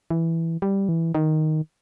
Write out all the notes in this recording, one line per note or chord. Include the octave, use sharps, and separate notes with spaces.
E3
G3
E3
D#3